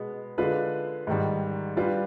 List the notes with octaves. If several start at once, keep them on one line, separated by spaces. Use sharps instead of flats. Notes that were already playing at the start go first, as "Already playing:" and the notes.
Already playing: B2 G#3 B3
D3 G#3 D4 F4 B4
G#2 D#3 G3
G3 D4 F4 B4